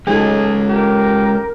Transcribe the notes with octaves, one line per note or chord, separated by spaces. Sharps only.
F#3 G#3 C#4 D#4 G#4 A4
G4 A#4